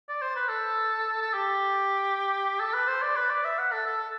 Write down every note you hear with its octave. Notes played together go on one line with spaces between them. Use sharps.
D5
C5
B4
A4
A4
G4
A4
B4
C5
D5
B4
D5
E5
F#5
A4
A4